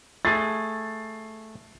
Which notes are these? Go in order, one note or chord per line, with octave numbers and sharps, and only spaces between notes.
A3 G#4 A6 C7